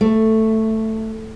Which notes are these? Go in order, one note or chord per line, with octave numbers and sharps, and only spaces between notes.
A3